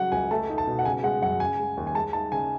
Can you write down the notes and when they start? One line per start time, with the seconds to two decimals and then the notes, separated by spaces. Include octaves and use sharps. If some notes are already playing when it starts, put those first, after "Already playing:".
Already playing: C#3 F#3 F#5
0.12 C#2 G#5
0.31 A3 A5
0.50 D#4
0.58 A5
0.67 B2
0.79 F#5
0.85 C#3 G#5
1.03 G#3 F#5
1.22 F#2 F#5
1.40 C#3 G#5
1.59 G#3
1.77 D#2
1.87 G#5
1.95 G#3 A5
2.13 D#4 A5
2.32 C#3 G#5